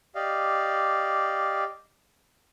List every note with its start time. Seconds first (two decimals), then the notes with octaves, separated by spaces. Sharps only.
0.15 G4 D5 D#5 F5